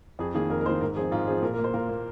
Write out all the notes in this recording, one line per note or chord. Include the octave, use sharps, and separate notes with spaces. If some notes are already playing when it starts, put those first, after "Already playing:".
F2 G#4
D#3 A#3 G#4
F2 A#4
A#4
D#3 A#3 C5
G#2 A#4
F3 C4 G#4
G#2 F4
F3 C4 G#4
A#2 A#4
A#4
A#3
C5
A#2 A#4
A#3